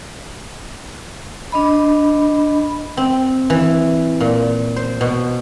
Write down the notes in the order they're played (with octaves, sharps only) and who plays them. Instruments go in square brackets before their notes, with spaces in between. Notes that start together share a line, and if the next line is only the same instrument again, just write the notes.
[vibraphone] D4 D#5 B5
[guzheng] C4
E3
A#2
C5
B2